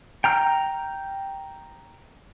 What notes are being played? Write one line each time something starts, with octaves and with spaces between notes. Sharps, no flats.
G5 A#5 F6